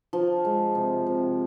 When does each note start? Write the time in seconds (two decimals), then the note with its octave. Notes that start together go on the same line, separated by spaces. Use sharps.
0.13 F3
0.45 G#3
0.75 C3
1.07 C3